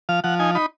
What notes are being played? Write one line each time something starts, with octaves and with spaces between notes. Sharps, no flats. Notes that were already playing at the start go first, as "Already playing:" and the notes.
F3 F5
F3 F#5
D#4 G#5
D#4 B5